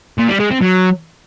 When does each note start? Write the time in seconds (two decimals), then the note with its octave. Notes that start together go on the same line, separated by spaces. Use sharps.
0.18 A#2
0.29 G3
0.40 G#3
0.51 C4
0.61 F#3